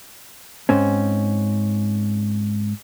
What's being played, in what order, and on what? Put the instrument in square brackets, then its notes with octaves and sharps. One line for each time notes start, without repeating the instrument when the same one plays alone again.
[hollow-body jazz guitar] G#2 C4 C#4